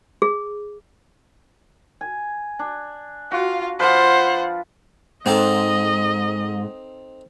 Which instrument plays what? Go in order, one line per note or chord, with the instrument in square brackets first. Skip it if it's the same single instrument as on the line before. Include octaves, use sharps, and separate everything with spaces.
[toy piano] G#4
[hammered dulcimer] G#5
D4
[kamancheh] F4 F5 [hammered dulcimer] F#4
[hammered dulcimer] F3 F4 B4 [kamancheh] C5 F#5
[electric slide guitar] G#2 [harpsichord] C4 D#4 A4 [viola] D#5